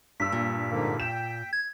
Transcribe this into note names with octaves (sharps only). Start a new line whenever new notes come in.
G2 E6 B6
A#2
G#2 D3 A#3
G5 E7
G#6